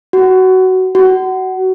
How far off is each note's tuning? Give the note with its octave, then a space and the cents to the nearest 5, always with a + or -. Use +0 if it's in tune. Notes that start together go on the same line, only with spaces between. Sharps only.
F#4 +15
F#4 +20